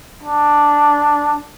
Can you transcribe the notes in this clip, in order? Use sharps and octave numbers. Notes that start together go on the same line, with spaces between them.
D4